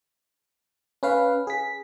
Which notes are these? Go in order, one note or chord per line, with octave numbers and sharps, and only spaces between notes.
C#4 B4 F5
G#4 B6